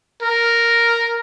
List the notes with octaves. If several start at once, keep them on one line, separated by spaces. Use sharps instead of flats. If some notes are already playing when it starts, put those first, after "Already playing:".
A#4